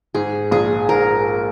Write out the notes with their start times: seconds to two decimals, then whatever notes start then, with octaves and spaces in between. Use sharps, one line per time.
0.15 G#2 G#4
0.51 A#1 G#4
0.89 G#2 A#4